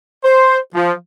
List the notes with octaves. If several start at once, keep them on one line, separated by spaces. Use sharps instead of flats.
C5
F3